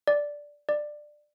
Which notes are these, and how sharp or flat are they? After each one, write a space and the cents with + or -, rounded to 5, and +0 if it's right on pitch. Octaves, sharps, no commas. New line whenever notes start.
D5 -5
D5 +15